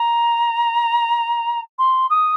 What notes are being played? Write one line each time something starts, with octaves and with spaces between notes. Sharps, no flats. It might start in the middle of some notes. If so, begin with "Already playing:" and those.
Already playing: A#5
C6
D#6